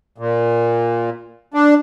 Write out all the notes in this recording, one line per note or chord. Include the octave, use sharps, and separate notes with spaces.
A#2
D4